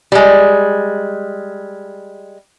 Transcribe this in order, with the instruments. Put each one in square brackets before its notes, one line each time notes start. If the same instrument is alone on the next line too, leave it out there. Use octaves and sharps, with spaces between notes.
[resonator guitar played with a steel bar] G3 G#3